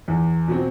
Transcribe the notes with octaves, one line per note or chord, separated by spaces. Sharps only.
E2
B2 F#3 C4